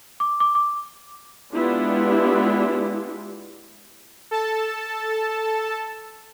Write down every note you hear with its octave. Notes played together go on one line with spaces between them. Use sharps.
D6
D6
D6
G#3 B3 D4 E4 F4 G4
A4 A5